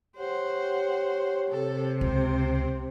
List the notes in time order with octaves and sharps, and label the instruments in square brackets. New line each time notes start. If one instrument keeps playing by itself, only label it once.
[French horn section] G4 C#5 [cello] C5 F#5
[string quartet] C3 [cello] A4
[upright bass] C#2 [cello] C4 C5